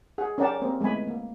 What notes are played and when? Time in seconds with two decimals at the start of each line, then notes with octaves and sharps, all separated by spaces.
0.18 G#4 F#5
0.38 C#4 A#4 D5 F#5 G5 A5
0.61 A#3 C4 A#4
0.81 G#3 A3 B3 G#5 B5
1.07 A#3